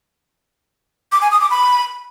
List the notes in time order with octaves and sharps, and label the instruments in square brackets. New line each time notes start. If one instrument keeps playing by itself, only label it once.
[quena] D6
G#5
D#6
D6
B5